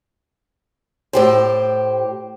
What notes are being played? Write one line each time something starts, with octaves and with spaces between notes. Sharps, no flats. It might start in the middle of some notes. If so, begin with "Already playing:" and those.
A2 G4 C5